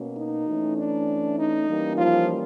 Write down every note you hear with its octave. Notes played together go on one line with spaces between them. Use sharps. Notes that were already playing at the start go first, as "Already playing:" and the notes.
Already playing: B2 A#3 C#4
D#4
E3 A3 C#4
D4
D#4
E3 G3 A#3 C#4
F3 F4